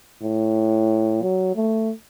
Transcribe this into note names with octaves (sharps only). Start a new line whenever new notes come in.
A2
F#3
A3